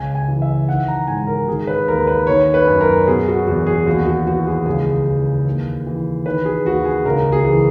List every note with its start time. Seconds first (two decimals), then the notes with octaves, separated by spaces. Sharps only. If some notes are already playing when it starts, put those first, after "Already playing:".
Already playing: C#2 G#5
0.15 G#5
0.28 E3
0.42 E5
0.68 D#3 F#5
0.88 A#5
1.07 G#2 G#5
1.27 A#4
1.47 D#3 G#4
1.67 B4
1.88 D#2 A#4
2.07 B4
2.27 D#3 C#5
2.54 B4
2.67 F#2
2.81 A#4
3.07 B2 G#4
3.27 F#4
3.47 E2 F#4
3.67 G#4
3.86 D#2 F#4
4.07 F#4
4.27 E3 F#4
4.47 G#4
4.66 C#2 G#4
5.07 E3
5.46 D#2
5.86 E3
6.26 D#3 B4
6.45 G#4
6.65 D#2 F#4
6.85 G#4
7.05 C#2 A#4
7.32 G#4
7.45 E3